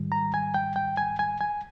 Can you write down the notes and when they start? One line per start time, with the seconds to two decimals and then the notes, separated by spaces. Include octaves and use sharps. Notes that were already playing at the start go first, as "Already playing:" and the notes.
Already playing: G#2 D#3 G3
0.12 A#5
0.34 G#5
0.54 G5
0.76 G5
0.97 G#5
1.19 G#5
1.41 G#5